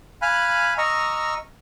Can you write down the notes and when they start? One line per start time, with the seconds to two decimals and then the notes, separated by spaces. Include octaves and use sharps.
0.22 F5 G#5 B5 F#6
0.78 D#5 A#5 C#6 E6 F6